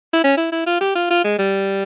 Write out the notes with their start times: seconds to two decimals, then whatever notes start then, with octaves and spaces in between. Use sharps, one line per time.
0.14 E4
0.24 C#4
0.37 E4
0.52 E4
0.66 F4
0.81 G4
0.96 F4
1.11 F4
1.24 G#3
1.39 G3